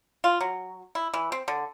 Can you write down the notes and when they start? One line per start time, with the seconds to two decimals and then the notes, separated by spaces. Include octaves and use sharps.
0.24 F4
0.41 F#3
0.95 E4
1.14 E3
1.32 C4
1.48 D3